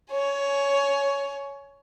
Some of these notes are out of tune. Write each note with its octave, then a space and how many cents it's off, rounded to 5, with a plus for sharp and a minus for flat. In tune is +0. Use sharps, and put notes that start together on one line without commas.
C#5 +10 G#5 +25